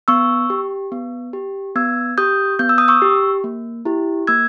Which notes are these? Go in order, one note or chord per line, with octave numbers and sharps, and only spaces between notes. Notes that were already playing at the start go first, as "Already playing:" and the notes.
B3 C#6 E6
G4
B3
G4
B3 E6 G#6
G4 D#6 G6
B3 G6
E6
D#6
C#6 E6
G4
A#3
E4 G4
A#3 E6 G#6